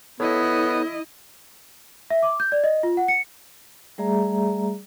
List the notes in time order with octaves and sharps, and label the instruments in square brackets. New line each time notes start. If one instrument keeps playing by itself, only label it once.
[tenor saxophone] B3 [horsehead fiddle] E4 D#5 [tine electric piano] A4 C#5
[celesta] E5
D6
G6
D5
D#5
F4
F#5
C#7
[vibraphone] G3 A3 G#4 D5 E5 A#5